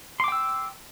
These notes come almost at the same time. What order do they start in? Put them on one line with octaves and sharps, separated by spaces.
C6 D6 G5 E6